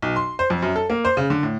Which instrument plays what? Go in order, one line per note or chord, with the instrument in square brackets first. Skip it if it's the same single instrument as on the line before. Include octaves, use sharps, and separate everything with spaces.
[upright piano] B1
C6
C5
F2
F#2
A4
A#3
C5
C#3
D3
A2